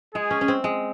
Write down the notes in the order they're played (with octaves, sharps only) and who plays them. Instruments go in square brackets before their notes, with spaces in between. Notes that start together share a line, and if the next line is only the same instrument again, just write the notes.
[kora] G#3 [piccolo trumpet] G#4
[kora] C#4
C#4
C4
G#3